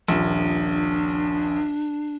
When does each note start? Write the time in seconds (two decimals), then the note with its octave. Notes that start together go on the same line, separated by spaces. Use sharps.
0.08 D#1 A#1 D4